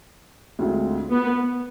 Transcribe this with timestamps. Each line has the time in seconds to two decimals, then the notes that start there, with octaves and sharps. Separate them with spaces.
0.59 D2 D3 G#3 C4 F4
1.11 B3